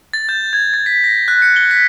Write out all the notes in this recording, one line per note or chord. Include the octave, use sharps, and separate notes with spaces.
A6
G6
G#6
A6
B6
A#6
F#6
C#7
G7
B6